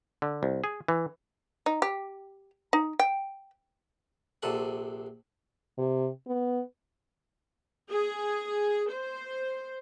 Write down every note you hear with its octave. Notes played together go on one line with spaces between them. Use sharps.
D3
C2
G#4
E3
D#4
G4
D#4
G5
A#1 C3 A4 F#5
C3
B3
G#4
C5